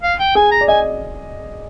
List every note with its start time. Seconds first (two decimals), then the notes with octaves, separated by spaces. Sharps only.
0.03 F5
0.19 G5
0.35 G#4 G#5
0.51 A#5
0.61 D5
0.68 D#5 G#5